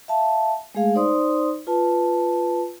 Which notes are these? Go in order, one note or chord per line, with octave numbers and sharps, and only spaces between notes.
E5 F5 A5
G#3 A3 G#4 F5
D#4 C5 D5 C6 D#6
F4 B4 A5